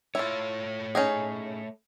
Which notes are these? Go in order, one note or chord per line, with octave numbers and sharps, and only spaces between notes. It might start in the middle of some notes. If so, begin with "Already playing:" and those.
A3 E4 F4 C#5
C#4 D#4 G#4